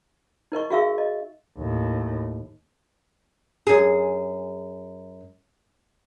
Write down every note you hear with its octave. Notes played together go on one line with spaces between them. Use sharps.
D#4 A#4 D#5 C#6
F#4 G#4 E5 F5 C#6 E6
D#5
D#2 A2
F#2 G#4